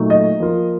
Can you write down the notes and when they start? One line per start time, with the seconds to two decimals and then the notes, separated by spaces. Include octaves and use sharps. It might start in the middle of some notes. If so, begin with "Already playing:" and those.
Already playing: A#2 F#3 A3 D#4
0.10 D#5
0.40 F3 A#3 F4